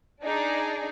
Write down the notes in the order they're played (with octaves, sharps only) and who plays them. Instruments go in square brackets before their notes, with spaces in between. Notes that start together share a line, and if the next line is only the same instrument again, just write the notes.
[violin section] D4 D#4 G#4 D5